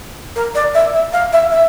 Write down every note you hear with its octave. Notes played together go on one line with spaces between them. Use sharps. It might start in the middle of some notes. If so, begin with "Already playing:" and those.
A#4
D5
E5
E5
F5
E5
E5